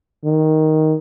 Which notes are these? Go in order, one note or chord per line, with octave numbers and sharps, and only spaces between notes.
D#3